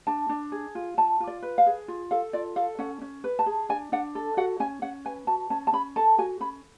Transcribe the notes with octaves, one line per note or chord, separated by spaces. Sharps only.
D4 A5
D4
G#4
F4
F4 A5
F4
D5
B4
F5
G#4
F4
A4 F5
F4 D5
A4 F5
C#4 F#5
C#4
B4
A5
G#4
D4 G#5
D4 F#5
A4
F#4 F#5
C#4 G#5
C#4 F#5
B4 G#5
F#4 A5
C#4 A5
A5
C#4 B5
A4 A5
F#4 G#5
C#4 B5